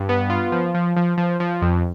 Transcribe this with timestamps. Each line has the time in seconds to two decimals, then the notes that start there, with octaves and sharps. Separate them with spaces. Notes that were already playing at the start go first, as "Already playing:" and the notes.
Already playing: G2
0.09 B3
0.30 F4
0.52 F3
0.74 F3
0.96 F3
1.18 F3
1.40 F3
1.62 F2